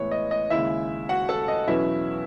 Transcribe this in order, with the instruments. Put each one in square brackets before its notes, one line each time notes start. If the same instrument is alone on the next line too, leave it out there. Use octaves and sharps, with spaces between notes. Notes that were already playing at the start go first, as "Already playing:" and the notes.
Already playing: [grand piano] A2 E3 G#3 B3 C#5
D#5
D#5
D#2 C#3 G#3 E4 E5
F#4 F#5
A4 A5
D#5
E2 B2 F#3 C#4 E4 E5